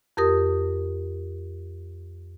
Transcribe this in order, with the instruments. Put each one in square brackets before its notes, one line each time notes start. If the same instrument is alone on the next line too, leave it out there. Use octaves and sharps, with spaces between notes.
[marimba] F2 G4 A#4 D#6